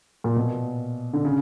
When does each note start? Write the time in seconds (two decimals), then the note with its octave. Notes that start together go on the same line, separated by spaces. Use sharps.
0.24 A#2
0.36 B2
1.13 D3
1.25 C#3